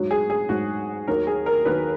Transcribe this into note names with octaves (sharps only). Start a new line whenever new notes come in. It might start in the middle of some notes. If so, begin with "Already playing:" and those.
Already playing: G#2 F#3
G#4
G#4
G#2 F#3 F#4
D#2 D#3 F#3 A#4
G#4
A#4
D#2 D#3 F#3 B4